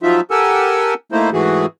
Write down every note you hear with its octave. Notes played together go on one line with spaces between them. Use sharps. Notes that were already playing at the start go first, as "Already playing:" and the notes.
F3 F#3 D#4 F4 E5
G4 A4 A#4 F#5 G#5 E6
A3 A#3 D#4 E4 C5
G#2 E3 A3 F#4 G#4